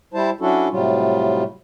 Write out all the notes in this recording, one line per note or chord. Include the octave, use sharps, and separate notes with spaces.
G3 E4 C5 A5
F#3 C#4 D4 E4 F#4 A4
A2 C3 F#3 G3 F4